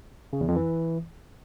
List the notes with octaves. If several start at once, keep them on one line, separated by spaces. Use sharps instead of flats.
C#3
E2
F2
E3